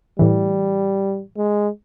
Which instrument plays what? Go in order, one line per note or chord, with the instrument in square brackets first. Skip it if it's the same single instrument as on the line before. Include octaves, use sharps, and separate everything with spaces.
[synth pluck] A2 E3 [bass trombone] G3
[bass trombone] G#3